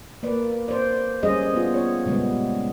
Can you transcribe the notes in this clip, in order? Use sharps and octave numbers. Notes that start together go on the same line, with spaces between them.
A#3 B4 D5
C5 D5
G3 C#4 G#4 C5 D#5
B3 F4
C#5
A#2 C#3 G3 G#3 B3